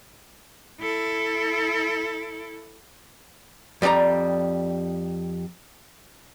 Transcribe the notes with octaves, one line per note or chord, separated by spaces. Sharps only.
E4 A4
F2 G3 A4 D5 A#5